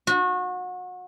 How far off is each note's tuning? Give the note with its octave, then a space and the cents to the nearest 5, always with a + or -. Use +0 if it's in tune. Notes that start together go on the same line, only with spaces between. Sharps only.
F#4 -30